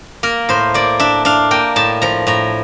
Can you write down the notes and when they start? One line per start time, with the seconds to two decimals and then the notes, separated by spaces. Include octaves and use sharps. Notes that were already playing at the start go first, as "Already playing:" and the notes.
0.23 A#3 A#4
0.49 A2 C5
0.74 A#3 D5
1.00 D4 E5
1.25 D4 F5
1.51 A#3 G5
1.76 A2 A5
2.02 F3 A#5
2.27 A2 A#5